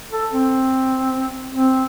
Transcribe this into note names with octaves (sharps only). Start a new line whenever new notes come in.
A4
C4
C4